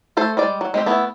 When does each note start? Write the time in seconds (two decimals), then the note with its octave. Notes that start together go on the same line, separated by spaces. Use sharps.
0.17 A3 A4 C5 G#5
0.37 G3 G#3 D5
0.61 F#3
0.74 G#3 C4 G4
0.86 A3 B3 E4